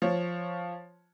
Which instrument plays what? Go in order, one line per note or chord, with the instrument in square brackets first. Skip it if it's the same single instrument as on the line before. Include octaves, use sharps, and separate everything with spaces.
[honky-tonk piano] F3 C#5